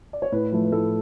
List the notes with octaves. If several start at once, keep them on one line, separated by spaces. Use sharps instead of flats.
D5
C#5
A2 B4
F3 A3 B4
B4
A2 A4